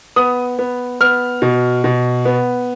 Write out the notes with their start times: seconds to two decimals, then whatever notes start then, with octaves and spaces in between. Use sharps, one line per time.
0.16 B3 D#6
0.59 B3
1.01 B3 F6
1.42 B2
1.84 B2
2.25 B3